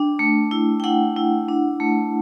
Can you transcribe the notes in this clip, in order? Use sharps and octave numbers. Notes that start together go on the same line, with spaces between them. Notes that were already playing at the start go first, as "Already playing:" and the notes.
Already playing: D4 G5
A3
E4
G5
E4 F#5
E4
D4
A3